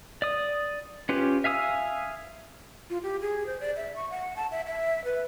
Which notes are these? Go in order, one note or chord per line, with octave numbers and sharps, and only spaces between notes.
D5 D#6
C#4 F4 G4 B4
E5 F5 G#5 D#6 E6
F4
G4
G#4
C5
D5
E5
C#6
F#5
A5
E5
E5
B4